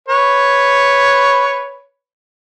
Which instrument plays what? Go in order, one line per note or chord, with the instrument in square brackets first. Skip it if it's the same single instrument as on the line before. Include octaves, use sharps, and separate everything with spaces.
[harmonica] B4 C#5